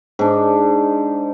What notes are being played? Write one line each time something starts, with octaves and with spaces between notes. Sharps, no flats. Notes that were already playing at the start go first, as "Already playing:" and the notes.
G#2 D4